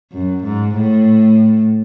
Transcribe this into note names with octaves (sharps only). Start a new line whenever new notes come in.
F#2
G#2
A2